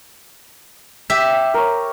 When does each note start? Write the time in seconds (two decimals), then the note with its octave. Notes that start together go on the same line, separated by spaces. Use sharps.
1.10 G4 E5
1.54 A#4 C#5